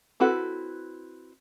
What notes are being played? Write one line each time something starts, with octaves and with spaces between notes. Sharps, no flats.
C4 E4 F#4 A4 B4